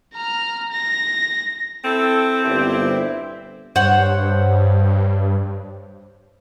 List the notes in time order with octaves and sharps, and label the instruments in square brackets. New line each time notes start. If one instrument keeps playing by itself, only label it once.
[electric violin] A#5 F6
A#6
[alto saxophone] C4 [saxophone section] E4 A4
[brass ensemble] G1 C5 [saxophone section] A#2 E4 G4
[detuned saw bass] G2 [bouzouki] C5 C#5 F#5